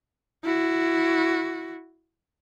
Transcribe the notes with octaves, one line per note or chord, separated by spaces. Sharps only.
E4 F#4